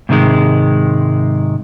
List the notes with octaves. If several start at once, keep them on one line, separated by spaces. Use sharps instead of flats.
G#2 C3 D#3 G3 G#3